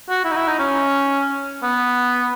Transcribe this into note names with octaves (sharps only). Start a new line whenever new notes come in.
F#4
E4
D#4
E4
D#4
C#4
B3